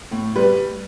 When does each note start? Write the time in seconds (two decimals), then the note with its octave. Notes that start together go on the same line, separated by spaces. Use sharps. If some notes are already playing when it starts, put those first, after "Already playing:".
0.11 A2
0.35 G3 B4